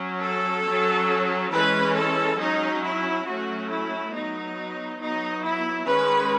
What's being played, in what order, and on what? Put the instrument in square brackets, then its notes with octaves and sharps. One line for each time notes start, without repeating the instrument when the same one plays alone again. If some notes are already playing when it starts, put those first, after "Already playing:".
Already playing: [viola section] F#3 C#4
A4
F#3 C#4
E3 G#3 C#4 B4
A4
F#3 C#4 D#4
E4
F#3 A3 C#4 F#4
E4
F#3 B3 D#4
F#3 B3 D#4
E4
D#3 G#3 C#4 B4